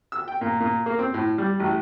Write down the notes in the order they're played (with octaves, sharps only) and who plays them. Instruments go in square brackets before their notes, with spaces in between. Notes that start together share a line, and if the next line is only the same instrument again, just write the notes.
[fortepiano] E6
G5
A#2
A#2
A#3
C4
A2
G3
A1